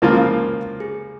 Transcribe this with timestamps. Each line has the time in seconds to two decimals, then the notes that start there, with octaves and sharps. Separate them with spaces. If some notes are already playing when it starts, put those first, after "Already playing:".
0.02 C#2 C#3 F3 A#3 F4 A#4
0.80 G#4